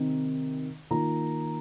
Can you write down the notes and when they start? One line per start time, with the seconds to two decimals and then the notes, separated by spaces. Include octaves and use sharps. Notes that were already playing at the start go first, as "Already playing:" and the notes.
Already playing: C3 D#3 C4 D#4
0.91 D#3 A#3 F4 A#5